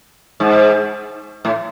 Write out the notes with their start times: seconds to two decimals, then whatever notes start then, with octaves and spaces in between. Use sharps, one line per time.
0.40 G#2
1.45 A2